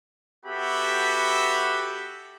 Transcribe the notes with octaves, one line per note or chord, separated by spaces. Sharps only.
B3 F#4 G4 A4 E5 B5